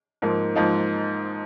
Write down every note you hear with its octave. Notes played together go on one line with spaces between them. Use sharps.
G#2 F3 A#3 D#4
G#2 F3 A#3 D#4